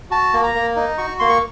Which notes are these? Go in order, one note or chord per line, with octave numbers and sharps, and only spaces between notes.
F#4 A5
A#3
A#5
A#3
D#4
F#4 C#6
A#3 C6
C#6